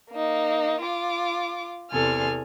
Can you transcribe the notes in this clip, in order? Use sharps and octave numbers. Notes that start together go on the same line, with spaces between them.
A#3 D#4
F4 D6
E2 C3 A4 G#5 F6